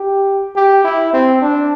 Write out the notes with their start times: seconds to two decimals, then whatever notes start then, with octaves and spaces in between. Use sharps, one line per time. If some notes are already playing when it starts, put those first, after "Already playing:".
Already playing: G4
0.56 G4
0.84 E4
1.13 C4
1.42 D4